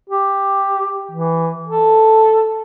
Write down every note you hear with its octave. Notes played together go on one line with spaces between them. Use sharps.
G4
E3
A4